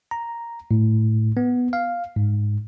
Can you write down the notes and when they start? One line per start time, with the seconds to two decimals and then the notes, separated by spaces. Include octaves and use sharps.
0.11 A#5
0.71 A2
1.37 B3
1.73 F5
2.16 G#2